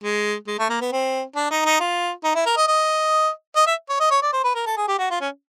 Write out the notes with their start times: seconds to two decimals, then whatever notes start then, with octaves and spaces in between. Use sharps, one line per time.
0.04 G#3
0.48 G#3
0.59 A3
0.70 A#3
0.81 B3
0.92 C4
1.36 D4
1.51 D#4
1.66 D#4
1.80 F4
2.24 D#4
2.35 E4
2.46 A#4
2.57 D#5
2.68 D#5
3.56 D#5
3.67 E5
3.89 C#5
4.00 D#5
4.11 C#5
4.22 D5
4.33 C5
4.44 B4
4.55 A#4
4.66 A4
4.77 G#4
4.88 G4
4.99 F#4
5.11 F4
5.21 C#4